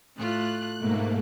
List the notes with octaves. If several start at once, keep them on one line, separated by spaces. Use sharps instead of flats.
A2 A3 F4 F#6
G#2 B2 A3 A#3